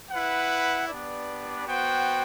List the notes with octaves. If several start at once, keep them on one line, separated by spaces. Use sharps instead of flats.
E4 B4 F#5
B3 D4 G4 B4 D5
B3 F#4 C5 G5